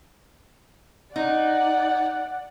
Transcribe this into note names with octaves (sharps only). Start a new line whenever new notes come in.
D#4 D5 F#5